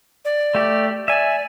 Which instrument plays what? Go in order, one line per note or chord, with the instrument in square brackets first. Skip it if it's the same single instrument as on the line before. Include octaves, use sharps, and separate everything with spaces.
[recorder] D5
[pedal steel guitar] A3 G4
[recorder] D5 [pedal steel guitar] E5 G#5